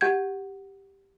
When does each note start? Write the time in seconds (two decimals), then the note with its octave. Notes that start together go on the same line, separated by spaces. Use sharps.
0.01 G4 F#5 G6 G#6